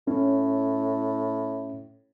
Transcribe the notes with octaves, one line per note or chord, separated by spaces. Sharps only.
A2 C#4